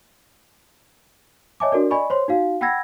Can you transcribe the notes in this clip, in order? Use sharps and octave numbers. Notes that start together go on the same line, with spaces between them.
C#5 D#5 E5 G#5 A5 D6
D4 F#4 A4 A#4 D5
D5 D#5 G#5 B5 C#6
C5 C#5 C6
D#4 F#4 F5
F#5 G5 B5 E6 G#6 A#6